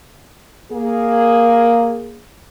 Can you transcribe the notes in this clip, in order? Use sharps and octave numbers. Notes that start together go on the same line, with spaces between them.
A#3 G#4